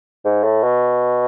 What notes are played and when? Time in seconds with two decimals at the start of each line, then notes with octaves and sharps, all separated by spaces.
0.25 G#2
0.43 A2
0.63 B2